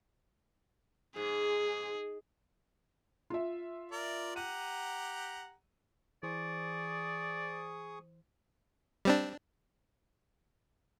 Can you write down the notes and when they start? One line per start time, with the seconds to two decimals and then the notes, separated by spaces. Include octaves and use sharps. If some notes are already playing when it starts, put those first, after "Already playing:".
1.16 G#2 G#4
3.30 F4 E5
3.92 A#4 D5
4.36 G4 F#5 A#5 D#7
6.23 E3 G#4 C5 D5 C#6 D#6
9.05 G3 C4 D4